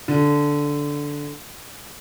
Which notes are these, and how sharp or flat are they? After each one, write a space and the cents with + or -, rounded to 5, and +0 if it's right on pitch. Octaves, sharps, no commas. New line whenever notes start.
D3 -5